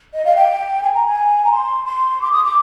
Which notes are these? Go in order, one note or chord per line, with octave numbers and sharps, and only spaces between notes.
D#5
F5
G5
G#5
A#5
G#5
A#5
C6
C6
D6
D#6
D6